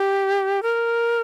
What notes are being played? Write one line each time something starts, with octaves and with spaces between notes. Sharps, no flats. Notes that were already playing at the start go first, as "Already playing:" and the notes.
Already playing: G4
A#4